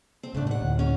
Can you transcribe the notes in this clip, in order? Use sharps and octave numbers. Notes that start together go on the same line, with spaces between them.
C4
A2 C#3 A3 D4
D#2 F#5
D2 A2 D3
C#4 A#4